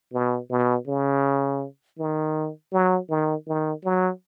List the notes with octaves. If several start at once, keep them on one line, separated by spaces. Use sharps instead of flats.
B2
B2
C#3
D#3
F#3
D#3
D#3
F#3